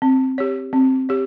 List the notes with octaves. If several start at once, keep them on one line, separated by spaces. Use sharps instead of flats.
C4
G4 C#5
C4
G4 C#5